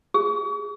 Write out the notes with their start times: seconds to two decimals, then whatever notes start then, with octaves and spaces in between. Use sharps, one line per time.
0.14 G#4